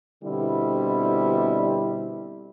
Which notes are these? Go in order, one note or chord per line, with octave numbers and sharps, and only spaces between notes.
B2 D3 G3 C4 E4